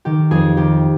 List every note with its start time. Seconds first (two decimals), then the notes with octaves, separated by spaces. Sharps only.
0.05 D#3 G4
0.31 F2 G#4
0.57 D#3 G4